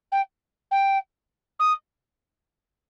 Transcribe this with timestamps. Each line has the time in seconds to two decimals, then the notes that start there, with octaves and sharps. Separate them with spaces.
0.12 G5
0.71 G5
1.59 D#6